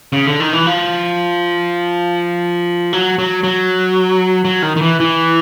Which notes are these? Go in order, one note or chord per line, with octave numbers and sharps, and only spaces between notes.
C#3
D3
D#3
E3
F3
F#3
F#3
F#3
F#3
D#3
D#3
E3
E3